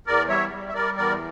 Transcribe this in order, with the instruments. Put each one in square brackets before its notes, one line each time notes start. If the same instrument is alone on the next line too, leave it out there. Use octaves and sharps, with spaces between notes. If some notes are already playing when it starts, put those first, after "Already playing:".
[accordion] E2 A#4 D5
G3 C#5 E5
G3
E5
G3 A#4 D5
E2 A#4 D5